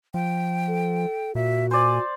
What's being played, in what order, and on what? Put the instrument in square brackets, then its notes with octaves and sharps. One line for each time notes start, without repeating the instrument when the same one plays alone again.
[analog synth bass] F3 [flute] G5
[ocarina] A4
[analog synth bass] A#2 [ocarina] F#4 [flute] E5
[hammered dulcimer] C5 D5 [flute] G#5